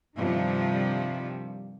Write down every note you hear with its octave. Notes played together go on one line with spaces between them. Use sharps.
G2 C3 D#3 F3 G3